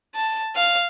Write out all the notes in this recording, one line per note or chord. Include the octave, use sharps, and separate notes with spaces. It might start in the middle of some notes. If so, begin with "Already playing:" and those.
A5
F5